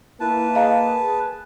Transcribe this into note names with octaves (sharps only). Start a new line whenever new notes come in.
A#3 E4 B4 A5
G#4 D#5 F5 A#5